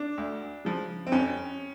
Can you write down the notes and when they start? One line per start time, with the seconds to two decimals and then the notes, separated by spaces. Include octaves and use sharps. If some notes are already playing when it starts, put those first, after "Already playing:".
Already playing: D4
0.18 D2
0.65 C#3 F3
1.07 C4
1.12 F2 C#4